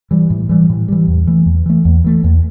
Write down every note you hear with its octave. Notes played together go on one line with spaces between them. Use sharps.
E3 G3
A2
E3 G3
A2
E3 G3
E2
E3 A3
E2
E3 A3
E2
E3 A3
E2